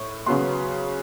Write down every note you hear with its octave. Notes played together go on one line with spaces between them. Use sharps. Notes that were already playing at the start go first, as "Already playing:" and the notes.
Already playing: A2
C#3 F#3 B3 C6